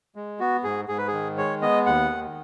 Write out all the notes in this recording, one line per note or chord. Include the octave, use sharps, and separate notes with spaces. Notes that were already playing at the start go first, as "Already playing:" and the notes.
G#3
B3 F#4
G#2 G#4
G#2 G#4
B4
G#4
D#3
G#3 C#5
B3 D#5
D#2 F#5
D#3